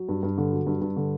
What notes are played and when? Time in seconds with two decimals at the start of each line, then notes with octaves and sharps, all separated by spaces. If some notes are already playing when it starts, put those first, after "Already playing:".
Already playing: F#3
0.09 G2
0.23 G2
0.38 D3
0.52 F#3
0.67 G2
0.81 G2
0.96 D3